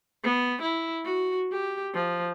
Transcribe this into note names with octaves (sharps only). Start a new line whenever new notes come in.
B3
E4
F#4
G4
F3